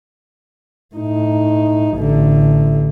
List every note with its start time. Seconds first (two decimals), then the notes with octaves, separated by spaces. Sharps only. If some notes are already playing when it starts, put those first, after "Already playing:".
0.95 A2 D#4
1.96 A1 D3